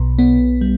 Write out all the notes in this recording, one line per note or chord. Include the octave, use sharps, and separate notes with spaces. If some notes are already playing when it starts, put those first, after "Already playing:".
Already playing: B1 B2
B3
G3